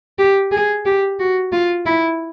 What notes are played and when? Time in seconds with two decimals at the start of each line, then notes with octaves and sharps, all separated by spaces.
0.19 G4
0.52 G#4
0.85 G4
1.19 F#4
1.52 F4
1.86 E4